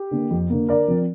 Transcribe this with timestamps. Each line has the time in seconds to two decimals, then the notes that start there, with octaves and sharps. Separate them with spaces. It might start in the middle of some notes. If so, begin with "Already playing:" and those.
Already playing: G4
0.11 D3 A#3
0.31 F2
0.50 D3 A#3
0.69 D3 A#4 D5
0.88 F3 C4